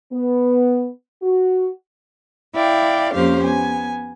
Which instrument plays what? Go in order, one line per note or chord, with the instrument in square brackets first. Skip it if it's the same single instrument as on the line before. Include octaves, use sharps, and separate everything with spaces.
[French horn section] B3
F#4
[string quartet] E4 D5 F5 G5
F2 A#3 C#4 G4 C5 F5
B3 G#5